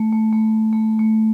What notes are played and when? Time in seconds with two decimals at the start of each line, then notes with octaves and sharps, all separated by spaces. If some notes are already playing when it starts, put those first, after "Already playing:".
Already playing: A3
0.13 A3
0.33 A3
0.73 A3
0.99 A3